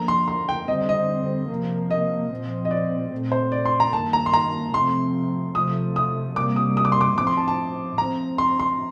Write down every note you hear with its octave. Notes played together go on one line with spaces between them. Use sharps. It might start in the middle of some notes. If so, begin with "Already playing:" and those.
Already playing: D3 F3 A#3 A#5
C6
C6
G5
D3 G3 C4 D#5
D#5
C3 F3 A#3
D#5
A#2 F3 C4
D#5
D5
A#2 A3 C4
C5
D5
C6
A#5
G2 D#3 A#3 A5
A#5
C6
A#5
C3 F3 A3 C4 C6
C3 F3 A3 D#6
D#6
C3 G3 A#3 D6
D#6
D#6
D6
C6
D6
A2 F3 C4 D6
C6
A5
A5
A2 F3 C4 A#5
C6
C6